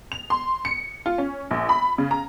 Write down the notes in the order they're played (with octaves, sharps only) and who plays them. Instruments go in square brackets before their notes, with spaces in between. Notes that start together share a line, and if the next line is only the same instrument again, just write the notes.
[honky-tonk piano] F7
C6
C#7
F4
C#4
A#1
B5
C#3
A#5